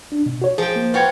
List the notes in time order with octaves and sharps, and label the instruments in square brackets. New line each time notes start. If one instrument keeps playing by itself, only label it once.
[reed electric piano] D4
B2
F#4 C#5
[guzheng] F3 G5 [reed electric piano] G#4
[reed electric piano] A#3
[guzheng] F4 F#4 C#5 [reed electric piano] B4 G5 G#6